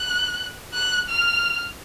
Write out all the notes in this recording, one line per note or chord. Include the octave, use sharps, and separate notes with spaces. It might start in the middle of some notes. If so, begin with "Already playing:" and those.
Already playing: F#6
F#6
F6